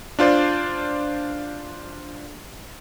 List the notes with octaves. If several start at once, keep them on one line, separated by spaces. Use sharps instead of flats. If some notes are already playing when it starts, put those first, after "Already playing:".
D4 F4 C5 D5